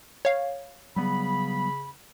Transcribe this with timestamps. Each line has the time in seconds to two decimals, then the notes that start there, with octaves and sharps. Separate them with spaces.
0.25 C#5 F5
0.96 C#3 F#3 G3 B3 B5